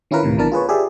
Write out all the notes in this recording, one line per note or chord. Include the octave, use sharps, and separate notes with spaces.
D#3 C#4 E4 F4 A#4 B4
D2 A2 C3 D#3
B1 B2 E3 D4 A#4 A5
F4 G#4 B4 C#5
G4 G#4 D5 E5